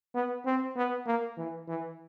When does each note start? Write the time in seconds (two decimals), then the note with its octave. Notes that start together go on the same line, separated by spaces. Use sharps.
0.15 B3
0.46 C4
0.76 B3
1.06 A#3
1.38 E3
1.68 E3